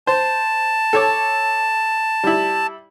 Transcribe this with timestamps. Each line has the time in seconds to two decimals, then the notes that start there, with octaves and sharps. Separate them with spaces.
0.07 C5 A5
0.93 A4 C#5 D6
2.23 G3 E4